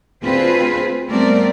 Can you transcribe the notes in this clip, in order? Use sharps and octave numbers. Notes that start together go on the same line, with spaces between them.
D2 C4 F4 G#4 B4 C5
G3 A3 B3 C4 A#4 D5